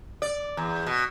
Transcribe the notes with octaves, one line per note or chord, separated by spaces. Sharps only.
D5
E2
B2